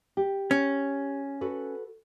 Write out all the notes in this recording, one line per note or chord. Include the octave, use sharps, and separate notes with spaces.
G4
C#4
F#4 A4 B4